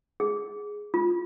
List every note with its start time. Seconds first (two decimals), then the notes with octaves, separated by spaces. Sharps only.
0.20 G#4
0.94 F4